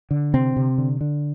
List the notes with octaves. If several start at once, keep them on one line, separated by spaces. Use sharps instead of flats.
D3
C3 C4
C3
D3
D3